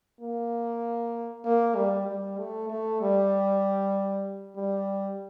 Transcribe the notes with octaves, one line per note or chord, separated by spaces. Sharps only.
A#3
A#3
G3
G3
A3
A3
G3
G3